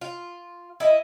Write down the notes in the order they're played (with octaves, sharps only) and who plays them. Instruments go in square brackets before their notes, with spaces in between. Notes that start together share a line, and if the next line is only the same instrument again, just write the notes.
[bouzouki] F4
E4 D#5